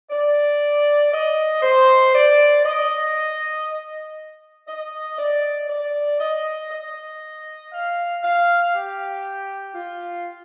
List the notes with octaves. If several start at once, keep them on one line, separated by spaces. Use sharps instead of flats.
D5
D#5
C5
D5
D#5
D#5
D5
D5
D#5
D#5
F5
F5
G4
F4